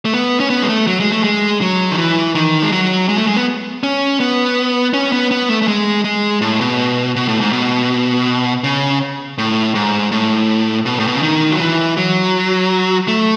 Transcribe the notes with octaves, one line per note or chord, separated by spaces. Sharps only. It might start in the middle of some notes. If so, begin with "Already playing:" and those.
A3
B3
C#4
B3
G#3
A3
F#3
G#3
A3
G#3
F#3
D#3
E3
D#3
G#3
F#3
G#3
A3
G#3
B3
C#4
B3
C#4
B3
B3
A3
A3
G#3
G#3
A2
B2
B2
A2
G#2
B2
C#3
A2
G#2
A2
B2
A2
B2
C#3
D#3
F#3
E3
F#3
A3